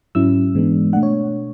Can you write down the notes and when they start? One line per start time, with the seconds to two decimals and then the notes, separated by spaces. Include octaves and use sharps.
0.15 G#2 F#3 C#4 E4 E6
0.55 G#2 E3 G#3 B3 D4
0.93 B2 A3 D4 F#5
1.03 C#5